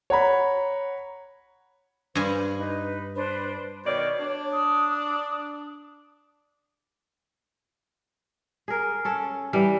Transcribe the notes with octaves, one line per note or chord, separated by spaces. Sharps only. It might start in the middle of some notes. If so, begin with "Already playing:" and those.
C#5 F#5 A#5 B5
G2 C5 F5 G#5 B5
D#4 B4
D4 B4 C5
B2 D#3 C#5 D5
D4
D#6
G#4 A#4
C#4 A4
E3 G3